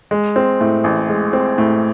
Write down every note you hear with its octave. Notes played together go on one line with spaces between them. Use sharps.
G#3
C4
A2
A1
G#3
C4
A2